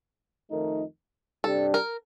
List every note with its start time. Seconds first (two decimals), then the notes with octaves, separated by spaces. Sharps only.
0.50 F2 D#3 A3 D#4 A#4
1.43 C3 G3 D4 G4 A4
1.74 A#4